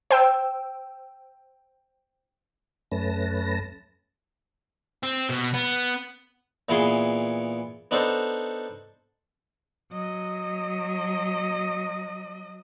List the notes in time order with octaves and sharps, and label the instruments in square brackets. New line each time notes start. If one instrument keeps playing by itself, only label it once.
[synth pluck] C5 G5 E6
[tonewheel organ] F#2 A3 C#4 B4 A5 A#6
[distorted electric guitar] C4
B2
B3
[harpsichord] A#2 E3 B3 G#4 G#5 C6
B3 D4 D#4 A4 C5
[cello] F#3 D#5